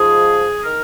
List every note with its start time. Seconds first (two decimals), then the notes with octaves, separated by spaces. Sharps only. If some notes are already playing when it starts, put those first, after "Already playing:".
Already playing: G#2 F3 G#4
0.64 D#3 A#4